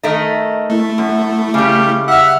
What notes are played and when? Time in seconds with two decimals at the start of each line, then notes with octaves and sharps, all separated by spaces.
0.03 D#3 A3 D#4
0.70 A3 E4
0.98 F#2
1.54 C#3 G3 G4
2.08 E5 F#5 F6